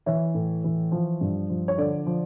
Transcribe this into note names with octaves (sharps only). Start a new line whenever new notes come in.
E3 C#5 E5
A2
E3
F3
G2
F3
C#5
D3 D5
F3